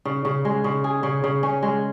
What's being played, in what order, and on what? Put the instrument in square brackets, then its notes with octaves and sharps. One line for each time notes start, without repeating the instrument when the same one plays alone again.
[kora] C#3
C#3
G#3
C#3
G#4
C#3
C#3
C#4
G#3